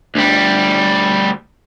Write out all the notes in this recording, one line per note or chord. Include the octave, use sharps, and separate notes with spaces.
D2 G3